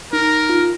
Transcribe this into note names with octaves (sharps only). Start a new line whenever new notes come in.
D#4 A#4
F4